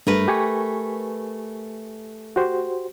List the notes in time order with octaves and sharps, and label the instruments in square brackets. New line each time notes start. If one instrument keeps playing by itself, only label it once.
[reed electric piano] G2 [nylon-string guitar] A3 A#4 B4
[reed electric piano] G4 G#5 C#6
F#4 G4 C5